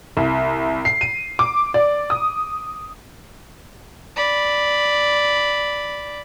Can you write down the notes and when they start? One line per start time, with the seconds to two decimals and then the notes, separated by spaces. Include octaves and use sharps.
0.17 C2
0.85 C7
1.01 D#7
1.39 D6
1.74 D5
2.10 D#6
4.16 D5 B5